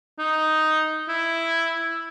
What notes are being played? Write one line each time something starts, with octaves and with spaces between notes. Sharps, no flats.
D#4
E4